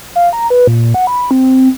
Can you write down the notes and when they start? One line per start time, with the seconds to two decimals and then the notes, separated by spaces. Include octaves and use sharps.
0.16 F5
0.33 A#5
0.50 B4
0.67 A#2
0.94 F#5
1.07 B5
1.31 C4